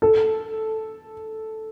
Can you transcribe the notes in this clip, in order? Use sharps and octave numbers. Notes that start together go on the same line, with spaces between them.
A4